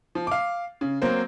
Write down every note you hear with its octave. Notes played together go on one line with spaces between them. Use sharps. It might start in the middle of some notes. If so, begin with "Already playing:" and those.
F3
F5 D6
C#3
F#3 A#3 C4 C5